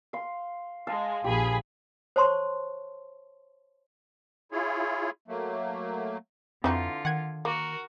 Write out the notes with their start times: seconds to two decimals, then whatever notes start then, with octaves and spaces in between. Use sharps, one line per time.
0.13 F5 C6
0.87 G#3 F5 A5
1.24 A#1 G4 G#4 B5
2.16 C5 C#5 A5 C6 C#6
4.52 E4 F4 G#4 C#5
5.28 F#3 A3 A#3
6.64 F2 D3 E3 C4 D#4 F4 F#4
7.05 D#3 F#5 G#6
7.45 A#3 F#4 A#4